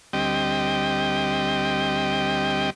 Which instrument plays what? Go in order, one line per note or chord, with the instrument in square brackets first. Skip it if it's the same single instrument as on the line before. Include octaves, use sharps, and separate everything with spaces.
[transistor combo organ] D2 G3 C4 D#5 G5